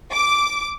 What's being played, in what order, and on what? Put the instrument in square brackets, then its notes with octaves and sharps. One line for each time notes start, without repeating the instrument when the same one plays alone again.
[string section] D6